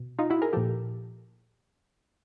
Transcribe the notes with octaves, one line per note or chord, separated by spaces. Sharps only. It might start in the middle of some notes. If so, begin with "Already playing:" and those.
Already playing: B2
D#4 F4
E4 F#4
G#4 A#4
A#2 F3 G4 A4